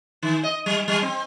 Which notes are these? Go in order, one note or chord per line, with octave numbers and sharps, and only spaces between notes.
D#3
D#5
G3
G3
C4